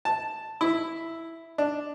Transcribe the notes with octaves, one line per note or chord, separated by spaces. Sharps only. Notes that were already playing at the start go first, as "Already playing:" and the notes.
A5
E4
D4